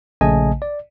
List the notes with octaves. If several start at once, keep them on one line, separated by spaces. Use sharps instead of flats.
A#1 C#3 A3 D#5 G#5 A5
D5